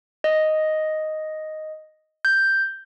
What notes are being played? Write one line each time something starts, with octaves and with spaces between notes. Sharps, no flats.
D#5
G6